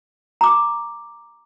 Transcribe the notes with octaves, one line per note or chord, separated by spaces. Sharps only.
A#5 D6